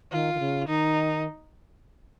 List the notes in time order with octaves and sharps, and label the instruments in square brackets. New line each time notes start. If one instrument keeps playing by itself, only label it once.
[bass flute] D#3 [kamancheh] F4
[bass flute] D#3
C#3
[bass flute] D#3 [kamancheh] D#4